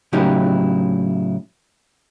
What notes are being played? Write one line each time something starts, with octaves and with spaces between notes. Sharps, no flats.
A2 C#3 F#3 D#4 E4 G4